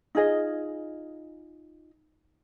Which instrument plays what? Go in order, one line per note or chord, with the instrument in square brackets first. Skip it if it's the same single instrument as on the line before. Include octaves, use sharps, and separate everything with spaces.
[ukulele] D#4 F4 G#4 D#5